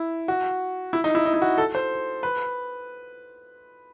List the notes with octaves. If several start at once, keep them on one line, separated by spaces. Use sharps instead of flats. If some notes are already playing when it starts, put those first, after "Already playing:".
Already playing: E4
F#4
E4
D#4
E4
D#4
E4
F#4
A4
C5
B4